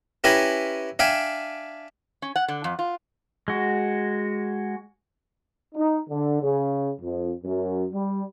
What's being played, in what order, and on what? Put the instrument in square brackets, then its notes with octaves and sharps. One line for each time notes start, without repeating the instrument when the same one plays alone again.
[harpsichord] C#4 E4 G4 B4 G#5 A#5
D4 E5 F5 G5 G#5
[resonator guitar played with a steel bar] C#4
F#5
D3
F2
F4
[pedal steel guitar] G#3 F#4
[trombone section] D#4
D3
C#3
F2
F#2
G3